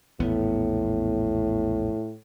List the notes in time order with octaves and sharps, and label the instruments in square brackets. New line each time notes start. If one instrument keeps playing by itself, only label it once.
[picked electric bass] A#1 E2 B3 [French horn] A2